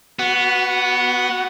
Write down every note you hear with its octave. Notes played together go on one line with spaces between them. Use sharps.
B3 F#4